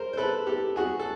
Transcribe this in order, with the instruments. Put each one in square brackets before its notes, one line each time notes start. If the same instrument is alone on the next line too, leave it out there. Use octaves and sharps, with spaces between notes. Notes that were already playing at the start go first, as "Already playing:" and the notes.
Already playing: [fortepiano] A#4 C5
C5
A4 B4
G4 A4
F#4 G#4
A4